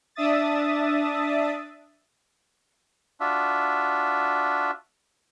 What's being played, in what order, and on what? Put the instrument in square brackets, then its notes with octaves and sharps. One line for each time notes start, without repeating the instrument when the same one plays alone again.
[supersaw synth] D4 E5 D#6 A6
[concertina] D4 F4 F#4 E5